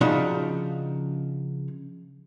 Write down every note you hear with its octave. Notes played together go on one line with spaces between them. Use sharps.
C#3 F3 D4 D#4 F#4